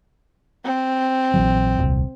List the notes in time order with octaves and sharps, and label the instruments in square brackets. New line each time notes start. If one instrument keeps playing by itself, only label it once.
[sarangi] C4
[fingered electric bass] A#1 E3 F#3
D#1 C2